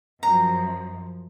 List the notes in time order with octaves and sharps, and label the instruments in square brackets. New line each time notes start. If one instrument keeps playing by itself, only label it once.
[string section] F#2 F3 [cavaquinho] A#5